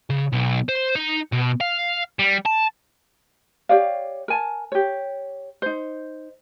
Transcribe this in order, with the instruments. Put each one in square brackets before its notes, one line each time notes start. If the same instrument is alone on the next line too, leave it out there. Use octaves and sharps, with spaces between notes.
[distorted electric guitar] C#3
B1
C5
D#4
B2
F5
G3
A5
[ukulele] G4 C#5 D5 F5
A#4 G#5 A5
G4 C#5
D#4 C5